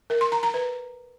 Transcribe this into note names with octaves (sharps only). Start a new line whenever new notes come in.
A#4
C6
A#5
A#5
B4